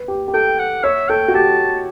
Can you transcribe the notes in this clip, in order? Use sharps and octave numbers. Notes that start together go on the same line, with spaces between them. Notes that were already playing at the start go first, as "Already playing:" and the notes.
Already playing: B4
G4
G4
A4 G5
F#5
C#5 E5
A4 G5
F#4
G4 A5